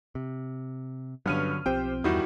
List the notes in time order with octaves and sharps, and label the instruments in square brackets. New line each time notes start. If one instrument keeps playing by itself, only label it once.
[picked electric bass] C3
[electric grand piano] G2 F6 D#7 [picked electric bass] D3 F#3 [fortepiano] B3 C#4
[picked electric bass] B1 F3 C4 [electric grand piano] G4 C5 [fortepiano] G5
[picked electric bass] E2 G2 [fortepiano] D#3 G3 [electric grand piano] E4 F#4